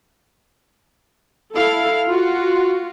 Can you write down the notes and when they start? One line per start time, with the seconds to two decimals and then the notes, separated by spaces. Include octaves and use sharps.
1.55 E4 A4 F5
2.08 F4 F#4